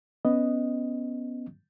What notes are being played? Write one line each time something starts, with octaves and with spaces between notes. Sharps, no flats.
B3 C#4 D#5